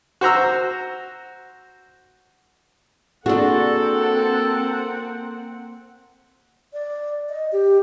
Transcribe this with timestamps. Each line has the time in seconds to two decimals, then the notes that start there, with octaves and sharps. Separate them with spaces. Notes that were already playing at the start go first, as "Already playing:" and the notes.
0.21 F#4 C5 A#5 E6
3.26 A#3 C4 D4 F#4 G#4 A4 F#5
6.73 D5
7.29 D#5
7.52 G4